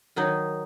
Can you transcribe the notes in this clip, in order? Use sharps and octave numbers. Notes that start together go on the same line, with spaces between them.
D#3 F#3 D#4